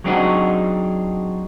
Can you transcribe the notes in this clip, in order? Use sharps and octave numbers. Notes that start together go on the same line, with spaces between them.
F#3 G#3 C4 D4 D#4 F#4